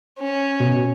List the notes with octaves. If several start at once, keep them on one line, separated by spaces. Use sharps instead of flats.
C#4
B2